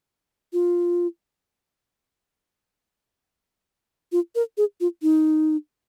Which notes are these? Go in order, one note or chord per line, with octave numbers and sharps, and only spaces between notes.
F4
F4
A#4
G#4
F4
D#4